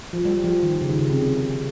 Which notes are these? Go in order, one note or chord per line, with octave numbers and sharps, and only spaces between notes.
F3
G3
F3
D#3
C#3
D#3
C#3
C3